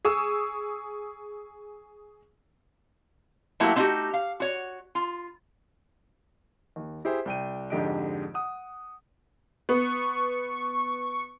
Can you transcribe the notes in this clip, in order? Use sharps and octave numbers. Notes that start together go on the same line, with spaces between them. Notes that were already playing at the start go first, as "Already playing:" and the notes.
G#4 C#6 D#6 E6
F#3 A3 A#3 E4 F#4 G4
A3 C4 D#4 E4 F#4 G4
F5
F#4 C#5
F4
D#2
E4 G4 G#4 C5
C2 G5 D#7
F2 G#2 D3 G4 D#5 D7
F#5 D#6
B3 C#6